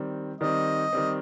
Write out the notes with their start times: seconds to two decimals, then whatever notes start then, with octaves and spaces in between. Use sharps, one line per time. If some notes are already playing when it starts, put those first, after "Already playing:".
Already playing: D#3 G3 C4
0.40 D#3 G3 C4 D#5
0.93 D#3 G3 C4